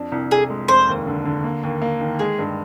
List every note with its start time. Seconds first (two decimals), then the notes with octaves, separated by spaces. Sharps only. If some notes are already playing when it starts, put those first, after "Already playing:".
Already playing: F2 D4
0.12 C2
0.31 C2 G#4
0.50 G#3
0.68 F1 C5
0.88 D#2
1.07 D3
1.25 D3
1.44 A#3
1.63 D#2
1.82 A#3
2.01 D#3
2.19 G#3 G#4
2.39 G2